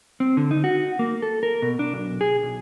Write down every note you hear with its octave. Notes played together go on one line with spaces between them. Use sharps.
C4
D3
D#4
F#4
A#3
A4
A#4
B2
D4
B1
G#4
B1